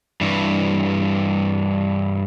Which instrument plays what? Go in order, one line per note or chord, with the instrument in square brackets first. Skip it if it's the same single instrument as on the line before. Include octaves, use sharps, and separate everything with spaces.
[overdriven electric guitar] G2 E3